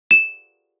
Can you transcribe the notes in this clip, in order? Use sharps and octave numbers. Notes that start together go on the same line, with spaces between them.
E7